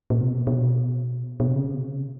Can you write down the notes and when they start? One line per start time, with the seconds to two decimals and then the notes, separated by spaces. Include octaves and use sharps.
0.10 A#2
0.20 C3
0.29 B2
0.47 B2
1.40 B2
1.48 C3
1.56 C#3
1.74 C3
1.82 C#3